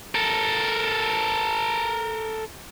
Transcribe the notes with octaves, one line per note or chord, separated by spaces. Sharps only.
A4 A#4